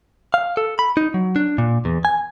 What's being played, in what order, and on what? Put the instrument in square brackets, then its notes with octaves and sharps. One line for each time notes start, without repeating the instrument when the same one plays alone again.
[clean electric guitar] F5
A4
B5
D#4
F#3
D4
A#2
E2
G#5